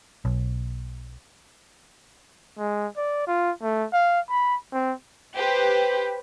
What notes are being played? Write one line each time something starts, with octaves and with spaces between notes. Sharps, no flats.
B1
G#3
D5
F4
A3
F5
B5
C4
G4 B4 C5